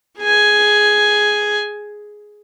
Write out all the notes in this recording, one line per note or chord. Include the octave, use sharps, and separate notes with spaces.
G#4 G#5